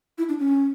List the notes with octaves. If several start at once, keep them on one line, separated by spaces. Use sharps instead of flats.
E4
D4
C#4